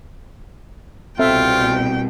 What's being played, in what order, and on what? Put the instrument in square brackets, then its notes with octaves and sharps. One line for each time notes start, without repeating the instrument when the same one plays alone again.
[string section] C2 B2 [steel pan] C4 A4 E5 [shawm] F4 [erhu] G5